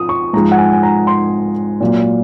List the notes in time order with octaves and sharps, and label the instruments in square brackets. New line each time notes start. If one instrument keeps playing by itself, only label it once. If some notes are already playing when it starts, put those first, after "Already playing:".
Already playing: [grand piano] F3 D#6
C#6
G#2 F3 G#3 A#5
F#5
G#5
G#5
A#5
C6
A#2 F#3